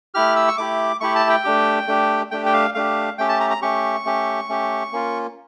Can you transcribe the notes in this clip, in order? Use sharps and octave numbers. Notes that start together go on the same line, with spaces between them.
A3 E4 G4 F6
E6
C#6
A3 E4 G4 D6
A3 E4 G4 C#6
A5
G5
A3 D4 G4
A3 D4 G4
A3 D4 G4 G5
G5
F5
A3 D4 G4 F5
A3 C#4 G4 G5
A5
A#5
A#5
A3 C#4 G4 C#6
A3 C#4 G4
A3 C#4 G4
A#3 C#4 F4